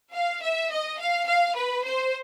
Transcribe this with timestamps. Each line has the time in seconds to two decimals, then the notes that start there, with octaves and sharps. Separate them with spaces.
0.14 F5
0.43 E5
0.71 D#5
0.99 F5
1.27 F5
1.56 B4
1.84 C5